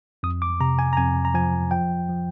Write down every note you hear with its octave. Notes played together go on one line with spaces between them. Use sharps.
F2 D#6
D6
C3 A#5
G#5
A#5
F2 G#5
A#5
F3 G#5
F3 G5
F3